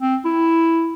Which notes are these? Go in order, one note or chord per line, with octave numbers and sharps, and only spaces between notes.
C4
E4